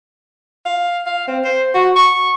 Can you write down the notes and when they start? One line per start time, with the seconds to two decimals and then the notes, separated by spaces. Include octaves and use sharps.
0.66 F5
1.06 F5
1.27 C4
1.44 C5
1.74 F#4
1.96 C#6